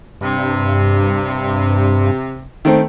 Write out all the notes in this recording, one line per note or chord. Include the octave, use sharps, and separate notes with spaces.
G2 C3
D#3 A3 C4